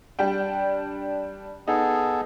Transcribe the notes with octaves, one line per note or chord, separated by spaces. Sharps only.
G3 D4 G5
B3 D#4 G#4 A4